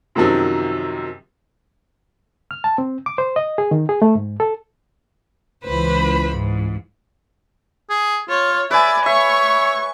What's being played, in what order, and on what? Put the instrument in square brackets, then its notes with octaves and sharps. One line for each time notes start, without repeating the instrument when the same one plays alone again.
[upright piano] F#2 C3 D#3 F3 F#3
[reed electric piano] F6
A5
C4
D6
C5
D#5
G#4
D#3
G#4
A3
G#2
A4
[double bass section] C#2 E3 [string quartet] B4 C5 B5
[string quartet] G#2
[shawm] G#4
[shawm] F4 [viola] C#5
[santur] B4 G#5 [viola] D5 [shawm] E5
[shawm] C#5 [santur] E5 [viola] C#6